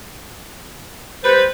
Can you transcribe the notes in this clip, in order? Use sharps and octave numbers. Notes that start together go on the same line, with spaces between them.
G3 B4 C5